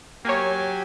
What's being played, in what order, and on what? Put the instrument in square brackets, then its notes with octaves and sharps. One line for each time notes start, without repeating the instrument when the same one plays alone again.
[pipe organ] F#3 G4 G#5 [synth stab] A#3 C#5